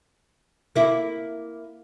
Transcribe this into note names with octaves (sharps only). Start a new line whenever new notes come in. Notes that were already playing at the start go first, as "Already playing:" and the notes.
A#3 E4